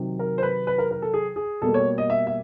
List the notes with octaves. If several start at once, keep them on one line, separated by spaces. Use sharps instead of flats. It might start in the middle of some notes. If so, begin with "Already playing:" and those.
Already playing: C3 D#3 F#3
A#4
C5
B4
B4
A#4
A#4
A4
G#4
G#4
B2 G3 A#3 A4
C#5
D#5
E5
E5